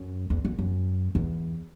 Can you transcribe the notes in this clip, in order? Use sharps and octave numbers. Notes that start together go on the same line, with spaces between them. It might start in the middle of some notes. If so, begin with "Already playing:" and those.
Already playing: F#2
E2
F#2
F#2
E2